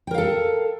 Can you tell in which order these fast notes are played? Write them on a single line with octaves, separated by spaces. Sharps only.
G5 A#4 F5 A4